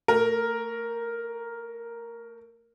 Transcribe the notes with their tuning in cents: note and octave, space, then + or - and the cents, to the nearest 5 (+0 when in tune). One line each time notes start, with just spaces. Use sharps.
A3 +30 A#4 +0